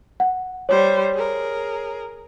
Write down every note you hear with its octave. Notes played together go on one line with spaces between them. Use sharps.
F#5
G3 C5 C#5
G#4 A#4